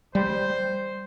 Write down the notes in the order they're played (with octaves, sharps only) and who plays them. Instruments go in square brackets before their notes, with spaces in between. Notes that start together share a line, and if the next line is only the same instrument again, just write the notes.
[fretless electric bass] G3 [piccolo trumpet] C5